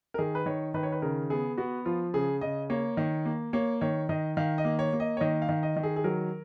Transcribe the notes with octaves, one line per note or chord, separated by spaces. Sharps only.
A#4
D#3 G#4
B4
D#3 C#5
D#3 B4
C#5
B4
C#3 A#4
B3 G#4
B3 F#4
F3 F4
C#3 G#4
C#3 D#5
A#3 C#5
D#3
A#3
A#3 C#5
D#3 C#5
D#3 D#5
D#3 F5
D#5
A#3
C#5
A#3
D#5
C#5
D#3 D#5
F5
D#3
D#5
D#3
G#4
G#4
F#3 A#4